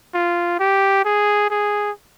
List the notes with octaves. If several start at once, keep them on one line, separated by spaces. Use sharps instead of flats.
F4
G4
G#4
G#4